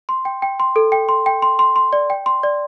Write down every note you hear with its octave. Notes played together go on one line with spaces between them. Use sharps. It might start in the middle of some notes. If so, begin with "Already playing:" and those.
C6
G5
G5
C6
A4
G5
C6
G5
C6
C6
C6
D5
G5
C6
D5